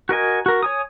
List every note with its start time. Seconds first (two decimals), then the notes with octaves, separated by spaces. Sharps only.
0.09 F#4 A#4 D#5 G#5
0.46 F#4 A#4
0.63 C#5 G#5 D#6